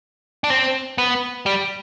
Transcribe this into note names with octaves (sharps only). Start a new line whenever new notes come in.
D4
C4
B3
G3